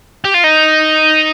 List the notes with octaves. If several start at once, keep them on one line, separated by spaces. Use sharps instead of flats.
G4
F4
D#4